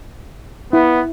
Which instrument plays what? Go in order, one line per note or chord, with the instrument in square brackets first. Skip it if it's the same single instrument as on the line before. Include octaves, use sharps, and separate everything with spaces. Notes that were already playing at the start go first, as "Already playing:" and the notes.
[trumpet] B3 [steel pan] E4